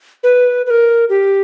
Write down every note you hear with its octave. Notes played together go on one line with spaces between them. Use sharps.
B4
B4
A#4
G4